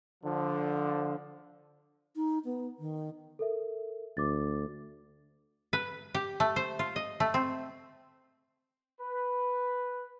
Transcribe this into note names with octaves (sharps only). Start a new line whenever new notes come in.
D3 F3
D#4
B3
D#3
A4 A#4 E5
D2 D6 A6
B4
G4
A3
C5
F4
D#5
A3
C4
B4